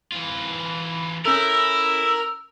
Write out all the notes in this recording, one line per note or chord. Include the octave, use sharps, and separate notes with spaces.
E3 F4
C#4 E4 A4 A#4 E6